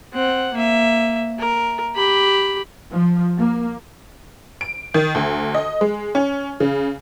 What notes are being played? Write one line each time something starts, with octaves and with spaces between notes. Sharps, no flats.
C4 F#5
A#3 E5
A#4
G4 B5
F3
A#3
D7
D#3
D2
D#5
G#3
C#4
C#3